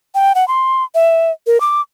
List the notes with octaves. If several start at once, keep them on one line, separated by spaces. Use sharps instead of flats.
G5
F#5
C6
E5
A#4
D6